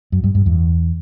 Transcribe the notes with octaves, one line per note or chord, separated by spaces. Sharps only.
F#2
G2
G2
E2